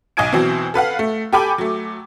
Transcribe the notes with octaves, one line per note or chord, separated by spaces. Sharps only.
B1 D#5 G#5 G#6 D7
B2 E3 F#3 C4
A4 B4 F5 F#5
A3
G4 A4 G5 G#5 B5 D6
F#3 A3